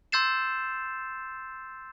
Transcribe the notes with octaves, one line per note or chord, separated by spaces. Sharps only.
C6 E6 G6 A6 C7 E7